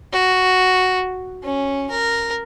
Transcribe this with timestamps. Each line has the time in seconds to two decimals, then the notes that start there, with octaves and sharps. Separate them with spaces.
0.13 F#4
1.43 C#4
1.91 A#4